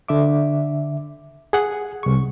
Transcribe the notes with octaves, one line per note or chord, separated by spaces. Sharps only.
D3 E5 D6
G#4 F#5
C2 C#6